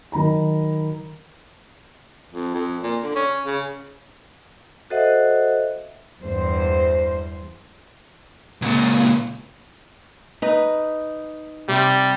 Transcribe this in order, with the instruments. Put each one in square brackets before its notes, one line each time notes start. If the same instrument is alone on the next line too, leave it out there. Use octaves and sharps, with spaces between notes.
[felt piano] D#3 F#3 A#5 B5
[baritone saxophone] F2
F2
A#2
D3
C#4
C#3
[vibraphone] F#4 A4 C5 D#5 E5 F#5
[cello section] E2 G2 C5
[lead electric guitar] C#2 A#2
[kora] D#4 B4
[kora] C3 [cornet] G3